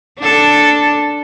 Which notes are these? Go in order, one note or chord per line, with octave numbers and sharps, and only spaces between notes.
D4 A4